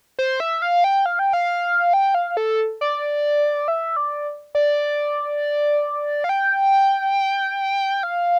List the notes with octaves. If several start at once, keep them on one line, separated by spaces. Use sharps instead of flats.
C5
E5
F5
G5
F5
G5
F5
G5
F5
A4
D5
E5
D5
D5
F5
G5
F5